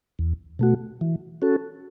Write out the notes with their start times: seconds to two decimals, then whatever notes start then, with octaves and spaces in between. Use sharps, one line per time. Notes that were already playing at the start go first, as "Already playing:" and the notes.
0.19 E2
0.59 B2 A3 F#4
1.01 E3
1.42 C#4 F#4 A4